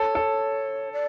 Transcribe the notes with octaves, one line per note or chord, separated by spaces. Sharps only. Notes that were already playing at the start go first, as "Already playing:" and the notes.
Already playing: A4 C#5
A4
D5